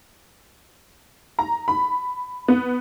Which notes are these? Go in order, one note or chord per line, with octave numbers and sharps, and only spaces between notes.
A#5
B5
B3